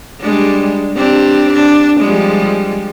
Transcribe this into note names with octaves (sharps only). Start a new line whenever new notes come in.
G3 G#3 D4
C4 D4 G4
D4
F3 G3 G#3